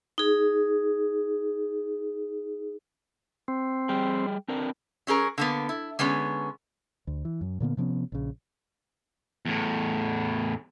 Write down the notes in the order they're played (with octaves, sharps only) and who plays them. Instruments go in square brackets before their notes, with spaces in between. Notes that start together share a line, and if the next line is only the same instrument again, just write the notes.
[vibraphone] D#4 G#4
[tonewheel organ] C4
[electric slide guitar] G3 G#4 G5
C4 D4 A#4
[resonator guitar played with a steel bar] F#3 C#4 G#4 A#4
D3 A#3 B3
E4
D3 G#3 B3 C#4
[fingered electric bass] D2
E3
F#2
A#2 D3 A#3 B3
C3 F3 B3 C#4
A#1 C#3
[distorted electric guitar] E2 A2